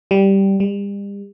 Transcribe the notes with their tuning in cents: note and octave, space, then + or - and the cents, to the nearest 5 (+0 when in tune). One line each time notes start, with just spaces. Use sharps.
G3 -5
G3 +40